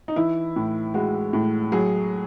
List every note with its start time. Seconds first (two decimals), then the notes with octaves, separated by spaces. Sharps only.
0.08 D#4
0.16 E3 E4
0.56 A2
0.94 G#3 F#4
1.33 A2
1.72 F#3 G#4